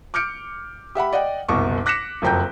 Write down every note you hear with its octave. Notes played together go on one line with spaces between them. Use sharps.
D6 F6 G6 C#7 D7
G4 E5 F#5 B5
D5 D#5 F#5 G5
F#1 C2 B2 C#6 D6
D6 F#6 A#6 B6 C#7 E7
F#1 F2 F#3 G5 A#5 G6